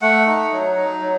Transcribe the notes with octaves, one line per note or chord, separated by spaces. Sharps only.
A3 F#5
D#4
F#3
D#4
F#3